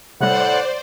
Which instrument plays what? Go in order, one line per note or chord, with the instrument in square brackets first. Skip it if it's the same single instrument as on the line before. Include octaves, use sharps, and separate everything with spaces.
[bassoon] A2 [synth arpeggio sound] C3 G3 [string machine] C5 D5 [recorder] F#5